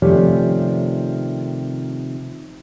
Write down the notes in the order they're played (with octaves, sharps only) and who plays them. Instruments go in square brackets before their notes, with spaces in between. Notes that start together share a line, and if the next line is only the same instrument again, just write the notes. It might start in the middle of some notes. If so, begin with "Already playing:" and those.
[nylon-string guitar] C3 D#3 F3 G3 A3 C#4